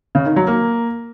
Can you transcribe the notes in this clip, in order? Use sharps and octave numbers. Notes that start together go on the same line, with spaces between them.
C#3
D#3
F#3
A#3